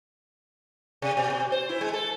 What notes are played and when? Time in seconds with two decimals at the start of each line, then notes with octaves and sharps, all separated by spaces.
1.02 C3
1.17 B2
1.30 B2
1.52 C5
1.69 E4
1.81 G#3
1.93 A4